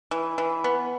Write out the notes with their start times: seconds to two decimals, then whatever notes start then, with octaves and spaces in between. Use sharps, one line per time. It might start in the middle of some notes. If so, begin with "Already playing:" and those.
0.11 E3
0.38 E3
0.64 B3